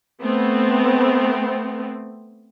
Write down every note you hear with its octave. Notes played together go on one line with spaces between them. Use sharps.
A3 B3 C4